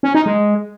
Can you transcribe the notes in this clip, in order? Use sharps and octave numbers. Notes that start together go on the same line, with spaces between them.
C#4
D#4
G#3